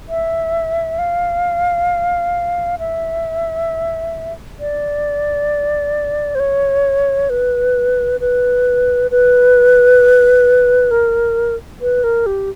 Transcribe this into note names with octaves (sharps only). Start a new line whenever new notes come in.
E5
F5
E5
D5
C5
C#5
B4
B4
B4
A#4
B4
A#4
G4